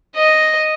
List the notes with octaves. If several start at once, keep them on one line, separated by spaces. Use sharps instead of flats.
D#5